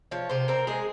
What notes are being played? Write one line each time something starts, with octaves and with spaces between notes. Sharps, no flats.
F3 C#5
C3 C5
C4 A#4
G#3 G#4